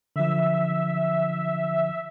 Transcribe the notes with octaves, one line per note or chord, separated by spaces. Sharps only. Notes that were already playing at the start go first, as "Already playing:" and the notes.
D3 F3 E5